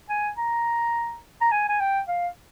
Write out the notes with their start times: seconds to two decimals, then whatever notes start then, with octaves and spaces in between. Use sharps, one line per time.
0.09 G#5
0.38 A#5
1.41 A#5
1.52 G#5
1.69 G#5
1.80 G5
2.08 F5